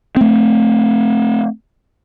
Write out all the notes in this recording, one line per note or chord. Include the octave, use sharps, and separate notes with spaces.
A3 C4